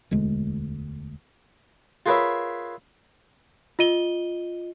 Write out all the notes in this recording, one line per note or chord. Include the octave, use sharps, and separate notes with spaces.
E1 D2 G#3
F4 G#4 A#4 B4 C#5 E5
F4 D#5 D#7 G7